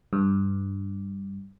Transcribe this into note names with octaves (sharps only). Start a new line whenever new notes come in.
G2